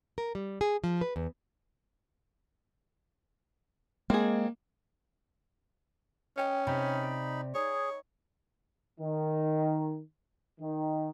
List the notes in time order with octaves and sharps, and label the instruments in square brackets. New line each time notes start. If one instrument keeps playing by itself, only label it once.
[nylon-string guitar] A#4
G3
G#4
F3
B4
E2
[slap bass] G#3 [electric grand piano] A#3 [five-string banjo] C4 G#4
[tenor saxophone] C#4 [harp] D#5 G5 D6
[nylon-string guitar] C3 [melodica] D#4 B5 [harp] G5
[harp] D5
[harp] D#4 [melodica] G#4 [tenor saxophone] C#5
[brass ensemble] D#3
D#3